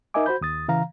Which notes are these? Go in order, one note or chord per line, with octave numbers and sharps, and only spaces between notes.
D#4 A#4 D#5 E5 G#5 D6
F#4 C5 B5 G6
D#2 D#6 A6
C#3 E3 F5 A#5